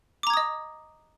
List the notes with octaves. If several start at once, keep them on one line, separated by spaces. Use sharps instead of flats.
D#5 A#5 D6 D#6 G#6